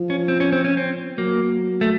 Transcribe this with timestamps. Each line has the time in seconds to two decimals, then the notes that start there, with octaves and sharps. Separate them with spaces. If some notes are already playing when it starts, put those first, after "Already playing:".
Already playing: F3
0.10 C#4
0.28 C4
0.40 C#4
0.52 C4
0.64 C#4
0.77 C4
1.18 F#3 A#3
1.81 A3